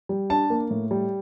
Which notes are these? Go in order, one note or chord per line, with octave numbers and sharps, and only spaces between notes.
G3
D4 A5
A#3
A2
G3